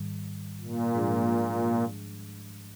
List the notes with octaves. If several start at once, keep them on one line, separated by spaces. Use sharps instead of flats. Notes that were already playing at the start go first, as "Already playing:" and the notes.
Already playing: G#2 D#3 G3
A#2
G#2 F3 G#3 D4 G#4